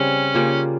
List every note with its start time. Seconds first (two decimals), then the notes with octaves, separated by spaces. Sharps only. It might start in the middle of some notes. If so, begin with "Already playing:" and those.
Already playing: C#3 G3 C4 C#4
0.34 C#3 G3 A#3 F4